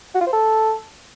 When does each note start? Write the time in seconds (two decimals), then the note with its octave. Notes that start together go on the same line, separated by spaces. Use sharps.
0.15 F#4
0.21 F4
0.27 C5
0.33 A4